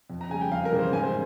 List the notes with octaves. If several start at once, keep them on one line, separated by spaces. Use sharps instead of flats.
F2
A#5
C#3 G3 G#5
G5
F2 F5
A#4
C#3 E3 G3
C5
G#2 G#5
C5